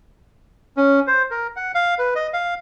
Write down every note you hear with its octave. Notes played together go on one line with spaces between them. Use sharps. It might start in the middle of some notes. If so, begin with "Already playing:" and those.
C#4
C5
A#4
F#5
F5
B4
D#5
F5